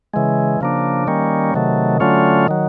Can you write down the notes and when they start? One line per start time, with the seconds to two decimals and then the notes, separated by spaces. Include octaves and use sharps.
0.14 C#3 E3 G#3
0.61 C#3 F3 A#3 D4
1.07 D#3 G3 A#3 C#4
1.54 C3 D#3 F#3 A3
2.00 D3 F#3 A3 C#4 F4
2.48 D#3 F#3